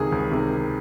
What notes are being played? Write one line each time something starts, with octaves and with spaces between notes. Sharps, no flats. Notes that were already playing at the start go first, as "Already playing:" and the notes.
Already playing: C#2 C3 D#3 G#4
C#2
C3 D#3